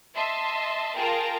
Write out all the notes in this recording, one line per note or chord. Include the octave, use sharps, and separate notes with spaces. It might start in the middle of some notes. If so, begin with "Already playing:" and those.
D#5 E5 A5 C6
F4 G#4 A#4 G5 A5 A#5